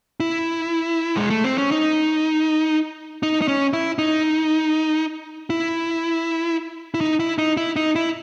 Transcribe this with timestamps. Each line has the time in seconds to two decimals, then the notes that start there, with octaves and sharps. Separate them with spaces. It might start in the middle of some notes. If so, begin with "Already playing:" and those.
0.20 E4
1.17 G#3
1.30 A3
1.44 C4
1.58 C#4
1.71 D#4
3.23 D#4
3.42 D#4
3.48 C#4
3.73 E4
3.98 D#4
5.50 E4
6.94 E4
7.01 D#4
7.20 E4
7.38 D#4
7.57 E4
7.76 D#4
7.96 E4